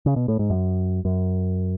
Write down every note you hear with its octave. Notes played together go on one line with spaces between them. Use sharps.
C#3
B2
A2
G#2
F#2
F#2